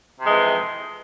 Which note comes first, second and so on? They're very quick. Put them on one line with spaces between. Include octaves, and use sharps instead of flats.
C3 F2 G#3 E3